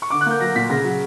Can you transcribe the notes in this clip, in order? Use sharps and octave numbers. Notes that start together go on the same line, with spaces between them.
C#6
D3 D6
F#6
A#3 G6
F#3 A#6
A#2 B6
C#3 A#6
F#3